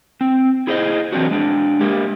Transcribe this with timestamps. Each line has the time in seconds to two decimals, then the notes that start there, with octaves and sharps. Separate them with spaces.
0.21 C4
0.67 E4 G#4 C5 D5 D#5
1.12 E3 F#3 C4 D4 F#4
1.31 G#3 D4
1.81 G#3 A#3 G4